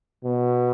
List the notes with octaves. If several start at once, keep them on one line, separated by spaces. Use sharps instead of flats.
B2